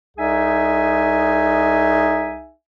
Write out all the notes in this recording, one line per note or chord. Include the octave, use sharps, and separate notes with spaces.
C2 D#4 G#4 E5 G#5